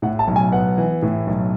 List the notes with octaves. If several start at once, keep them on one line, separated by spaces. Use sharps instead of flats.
A2 F#5
A5
B1
G#5
B3 F#5
E3
A2
B1